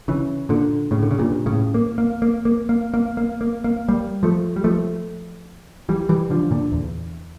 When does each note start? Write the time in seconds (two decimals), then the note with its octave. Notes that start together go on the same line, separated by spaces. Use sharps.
0.08 C#3 E3
0.49 A#2 D3
0.91 A2 C#3
1.02 D3
1.11 C#3
1.19 G2 A#2
1.46 A2 C#3
1.74 A#3
1.98 A#3
2.22 A#3
2.45 A#3
2.69 A#3
2.94 A#3
3.17 A#3
3.41 A#3
3.64 A#3
3.88 G3 A#3
4.23 F3 A3
4.56 G3
4.64 F3 A3
5.89 E3 G3
6.09 E3 G3
6.30 D3 F3
6.51 A#2 D3
6.72 E2